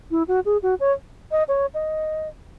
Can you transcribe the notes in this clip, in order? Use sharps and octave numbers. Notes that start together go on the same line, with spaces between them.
E4
F#4
G#4
F#4
C#5
D#5
C#5
D#5